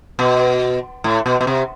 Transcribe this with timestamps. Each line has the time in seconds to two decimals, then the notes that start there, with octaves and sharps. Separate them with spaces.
0.19 B2
1.04 A2
1.26 B2
1.41 B2
1.47 C3